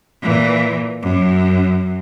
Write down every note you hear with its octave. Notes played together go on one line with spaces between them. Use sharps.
A#2 E3
F#2